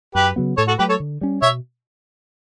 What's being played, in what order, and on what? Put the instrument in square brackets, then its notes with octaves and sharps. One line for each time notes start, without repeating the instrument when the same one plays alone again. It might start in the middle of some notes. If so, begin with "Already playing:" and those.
[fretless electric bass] F#2 [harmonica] G4 B4
[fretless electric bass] C#3 F#3 B3
[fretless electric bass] A2 [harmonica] A4 C#5
[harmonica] F#4 A4
[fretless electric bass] F#3 A3 [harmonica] G4 B4
[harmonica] A4 C#5
[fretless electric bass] D3
G3 C#4
[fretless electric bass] B2 [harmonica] C#5 E5